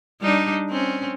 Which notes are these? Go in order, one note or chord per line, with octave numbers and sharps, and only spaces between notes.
G3 D4 D#4
C4 C#4